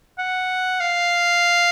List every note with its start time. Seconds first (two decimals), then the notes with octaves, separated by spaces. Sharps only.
0.18 F#5
0.80 F5